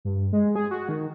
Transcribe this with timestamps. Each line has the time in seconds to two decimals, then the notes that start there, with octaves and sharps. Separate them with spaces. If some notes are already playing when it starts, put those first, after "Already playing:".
0.05 G2
0.33 G#3
0.56 G#4
0.71 F#4
0.89 D#3